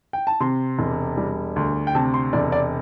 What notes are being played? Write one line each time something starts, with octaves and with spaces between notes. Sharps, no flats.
G5
A5
C3 C6
E1
G3
D2
G5
C3 A5
C6
E1 D5
D5